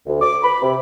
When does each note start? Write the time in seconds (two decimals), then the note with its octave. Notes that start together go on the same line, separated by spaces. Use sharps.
0.06 D2
0.21 D6
0.42 B5
0.62 C3